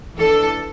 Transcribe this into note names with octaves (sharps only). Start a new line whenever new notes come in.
E3 D4 A4